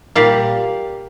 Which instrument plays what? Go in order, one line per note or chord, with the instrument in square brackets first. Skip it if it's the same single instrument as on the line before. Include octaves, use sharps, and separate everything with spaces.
[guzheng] A#2 G3 A#3 F5